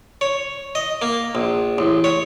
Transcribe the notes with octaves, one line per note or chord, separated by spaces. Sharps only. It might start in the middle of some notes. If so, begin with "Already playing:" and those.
C#5
D#5
A#3
A#1
A1
C#5